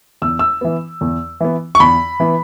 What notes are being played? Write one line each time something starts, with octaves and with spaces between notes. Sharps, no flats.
E2 E6
E6
E3 B3
E2
E3 B3
C#6
E2 B5
E3 B3